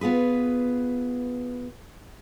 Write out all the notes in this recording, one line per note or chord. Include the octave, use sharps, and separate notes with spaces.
B3 F4 G#4 B4